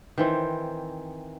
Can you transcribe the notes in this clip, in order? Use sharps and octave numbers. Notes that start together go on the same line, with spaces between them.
D#3 E3 C4